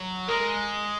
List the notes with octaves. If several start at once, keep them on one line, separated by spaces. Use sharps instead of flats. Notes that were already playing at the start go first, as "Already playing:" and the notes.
Already playing: F#3
G#3 A#4